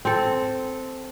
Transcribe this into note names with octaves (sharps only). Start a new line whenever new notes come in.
C4 A4